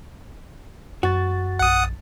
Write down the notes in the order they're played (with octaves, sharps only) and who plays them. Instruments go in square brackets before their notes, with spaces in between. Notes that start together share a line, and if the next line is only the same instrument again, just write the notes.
[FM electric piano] F#2 A6 [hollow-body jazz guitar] F#4
[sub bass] A#1 [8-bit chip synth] F#5 D#6